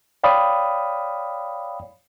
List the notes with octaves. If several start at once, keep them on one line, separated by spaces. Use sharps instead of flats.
C#5 D5 F5 G5 B5 D#6